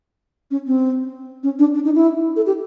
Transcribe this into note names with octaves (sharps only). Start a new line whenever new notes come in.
C#4
C4
C#4
D4
D4
D#4
E4
A4
G4